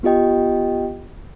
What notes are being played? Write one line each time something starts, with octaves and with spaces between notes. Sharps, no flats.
B3 F4 G4 D#5 G5